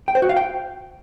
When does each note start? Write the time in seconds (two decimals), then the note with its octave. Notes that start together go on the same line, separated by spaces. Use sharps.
0.08 G5
0.15 C5
0.22 F#4
0.29 F5
0.37 G5